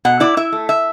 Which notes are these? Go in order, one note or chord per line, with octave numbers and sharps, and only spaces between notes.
B2 F#5
E4 D5
E4 E5
A3
E5